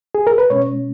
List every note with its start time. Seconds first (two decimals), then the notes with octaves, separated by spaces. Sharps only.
0.15 G#4
0.27 A#4
0.38 B4
0.50 B2 G#3 C#4 C#5